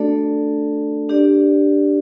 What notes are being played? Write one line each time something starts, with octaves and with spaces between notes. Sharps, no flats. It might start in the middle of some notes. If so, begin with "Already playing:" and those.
Already playing: A3 D4 F#4 A4 D5
D4 G4 D5